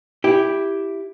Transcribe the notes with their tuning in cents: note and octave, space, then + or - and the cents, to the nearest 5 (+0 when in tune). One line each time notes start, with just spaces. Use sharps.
E4 +0 G4 +0